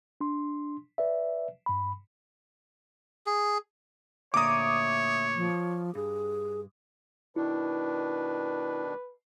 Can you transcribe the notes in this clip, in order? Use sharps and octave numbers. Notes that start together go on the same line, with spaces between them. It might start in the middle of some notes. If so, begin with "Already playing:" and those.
D4 C6
B4 D5 E5
G2 B5
G#4
D2 A#2 C#5 E5 A#5 D6 D#6
F3
G2 G#4
B2 D#3 D4 E4 B4